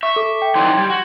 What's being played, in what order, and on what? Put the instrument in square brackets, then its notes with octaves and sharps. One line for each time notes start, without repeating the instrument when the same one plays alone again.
[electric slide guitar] E5 [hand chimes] C#6
[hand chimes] A4 D6
G5
[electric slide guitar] D#3 E3 F#3 [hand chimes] C6
[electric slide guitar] G3 [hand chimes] G#6
[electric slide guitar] F#4